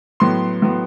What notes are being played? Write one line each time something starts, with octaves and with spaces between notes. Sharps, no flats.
A2 F#3 B3 C6
A2 F#3 B3